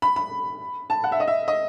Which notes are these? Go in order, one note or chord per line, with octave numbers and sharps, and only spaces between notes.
B5
B5
A5
F#5
E5
D#5
E5
D#5